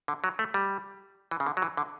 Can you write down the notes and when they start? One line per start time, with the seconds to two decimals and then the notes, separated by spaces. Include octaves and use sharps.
0.08 D3
0.24 F#3
0.39 A3
0.54 G3
1.31 E3
1.40 C#3
1.46 D3
1.57 F#3
1.62 E3
1.77 D3